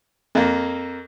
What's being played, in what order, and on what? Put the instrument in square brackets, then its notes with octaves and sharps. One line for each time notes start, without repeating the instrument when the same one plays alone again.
[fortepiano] F2 A#3